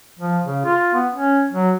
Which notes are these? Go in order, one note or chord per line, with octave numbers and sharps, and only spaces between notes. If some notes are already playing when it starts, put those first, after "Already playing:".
F3
C#3
F4
B3
C#4
F#3